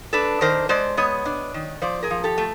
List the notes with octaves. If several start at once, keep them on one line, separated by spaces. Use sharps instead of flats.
D4 A4 B4
D#3 A#4 C5
G#3 C5 D5
B3 C#5 D#5
D4
D#3
F3 C5 D5
G#4 A#4
F3
G4 A4
A3